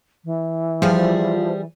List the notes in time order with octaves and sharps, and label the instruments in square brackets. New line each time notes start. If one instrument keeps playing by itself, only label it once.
[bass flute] E3
[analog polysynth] F3 [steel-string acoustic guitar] G3 G#4